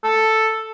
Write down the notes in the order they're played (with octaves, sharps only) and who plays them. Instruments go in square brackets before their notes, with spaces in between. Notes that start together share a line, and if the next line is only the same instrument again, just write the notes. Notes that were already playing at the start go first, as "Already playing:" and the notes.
[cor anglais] A4